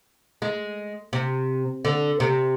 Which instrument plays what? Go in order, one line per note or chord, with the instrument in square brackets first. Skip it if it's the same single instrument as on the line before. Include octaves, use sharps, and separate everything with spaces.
[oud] G#3
C3
D3
C3